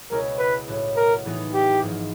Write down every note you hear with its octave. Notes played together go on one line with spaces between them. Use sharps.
C#2 B2 G#3 C#4 E4 A#4
B4
B1 A2 F#3 B3
A#4
A2 E3 G#3 B3 D#4
G4
G#1 G#2 F3